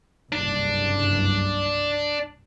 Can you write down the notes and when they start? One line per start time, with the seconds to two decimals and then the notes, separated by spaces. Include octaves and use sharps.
0.32 F#1 C2 G2 D4